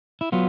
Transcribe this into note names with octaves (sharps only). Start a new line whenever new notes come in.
E4
F#3 B3 F4